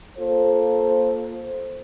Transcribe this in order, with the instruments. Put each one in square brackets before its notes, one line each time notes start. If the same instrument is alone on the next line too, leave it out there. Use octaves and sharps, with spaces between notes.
[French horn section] A#3 F4 A4 C5